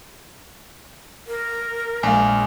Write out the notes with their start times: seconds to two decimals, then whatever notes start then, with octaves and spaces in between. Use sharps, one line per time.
1.27 A#4
2.03 A#1 G#3 F5 G#5